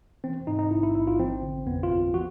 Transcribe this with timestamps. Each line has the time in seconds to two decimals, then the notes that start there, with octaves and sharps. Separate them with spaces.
0.24 E3 C4
0.47 G#2 D#4
0.59 D#4
0.71 A1 E4
0.83 E4
0.95 A1 E4
1.07 F4
1.19 F3 C4
1.42 D3
1.67 F2 B3
1.83 F4
1.91 F2
2.14 F3 F#4